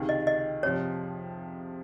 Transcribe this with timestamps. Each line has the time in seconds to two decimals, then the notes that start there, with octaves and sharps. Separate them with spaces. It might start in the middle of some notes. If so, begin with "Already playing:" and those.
Already playing: C#2 C3 D#3
0.09 D#5
0.27 D#5
0.63 F2 C3 F3 C#5